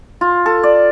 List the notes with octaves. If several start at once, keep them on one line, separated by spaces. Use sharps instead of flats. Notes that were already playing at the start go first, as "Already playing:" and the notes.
F4
A4
D5